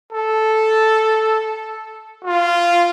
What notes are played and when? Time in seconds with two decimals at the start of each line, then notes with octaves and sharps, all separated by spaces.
0.13 A4
2.24 F4